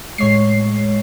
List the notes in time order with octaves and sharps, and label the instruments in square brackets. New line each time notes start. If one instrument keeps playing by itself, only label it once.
[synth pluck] A2 C#5 C7 [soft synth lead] G#3